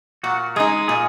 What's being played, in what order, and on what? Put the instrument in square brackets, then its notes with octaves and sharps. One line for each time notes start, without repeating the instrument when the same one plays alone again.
[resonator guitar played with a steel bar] A#2 [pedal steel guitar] F#4
[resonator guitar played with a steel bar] G#3 D#4 [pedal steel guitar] G#4
[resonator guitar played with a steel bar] A#2 [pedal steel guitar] G#4